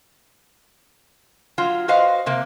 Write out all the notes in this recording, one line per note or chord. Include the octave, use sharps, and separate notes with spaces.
F#3 F4
F#4 B4 C5 D#5 F5
C3 A#3